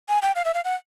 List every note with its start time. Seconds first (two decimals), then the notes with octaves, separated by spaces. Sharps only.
0.09 G#5
0.22 G5
0.35 F5
0.45 E5
0.54 F5
0.64 F#5